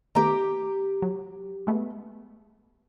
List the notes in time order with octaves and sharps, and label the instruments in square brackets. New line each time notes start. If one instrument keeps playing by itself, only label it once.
[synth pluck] D#3 A3 B3 [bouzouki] G4 A#5
[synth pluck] F#3
G#3 A3 B3